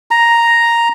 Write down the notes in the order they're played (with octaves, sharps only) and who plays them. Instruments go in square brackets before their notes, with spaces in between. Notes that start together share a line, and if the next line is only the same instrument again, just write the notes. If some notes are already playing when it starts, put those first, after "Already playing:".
[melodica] A#5